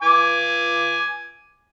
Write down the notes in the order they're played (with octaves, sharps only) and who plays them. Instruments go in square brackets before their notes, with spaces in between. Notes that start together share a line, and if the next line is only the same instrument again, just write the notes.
[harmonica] G#5 D6